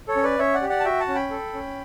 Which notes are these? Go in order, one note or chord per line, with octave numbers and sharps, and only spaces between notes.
A4 C#5
C#4
B4 D5
C#4 C#5 E5
D5 F#5
G4
D5 F#5
A5
F#4 E5 G5
F#5 A5
C#4
G5 B5
A4
C#4